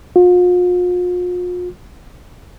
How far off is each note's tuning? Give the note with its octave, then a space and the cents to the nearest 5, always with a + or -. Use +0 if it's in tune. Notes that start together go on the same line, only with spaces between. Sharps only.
F4 +40